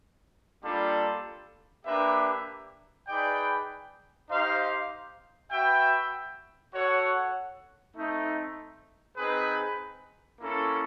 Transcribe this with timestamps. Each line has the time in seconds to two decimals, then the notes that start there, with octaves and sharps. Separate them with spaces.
0.64 G3 A#3 D4 F4 A4
1.85 A#3 D4 G4 B4 E5
3.07 D#4 G#4 B4 D5 G5
4.29 D#4 G4 C5 F5
5.52 F#4 B4 E5 G5
6.74 F#4 A4 C#5 F#5
7.95 A3 C4 D#4
9.17 C4 D#4 G#4 B4
10.40 A#3 C#4 E4 A4